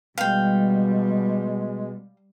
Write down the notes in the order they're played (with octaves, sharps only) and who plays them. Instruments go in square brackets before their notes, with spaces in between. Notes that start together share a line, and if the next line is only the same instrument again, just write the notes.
[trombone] B2 [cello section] G3 [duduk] G#3 [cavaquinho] F5 G5